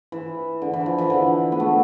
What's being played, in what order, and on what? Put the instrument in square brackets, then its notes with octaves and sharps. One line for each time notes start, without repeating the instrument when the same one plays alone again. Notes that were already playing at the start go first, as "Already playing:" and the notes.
[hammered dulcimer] E3
D3
E3
F3
E3
D3
B3
A3